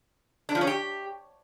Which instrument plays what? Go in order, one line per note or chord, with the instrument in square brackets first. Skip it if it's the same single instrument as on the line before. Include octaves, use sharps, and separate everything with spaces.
[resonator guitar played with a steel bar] D4
F3
C#4
G4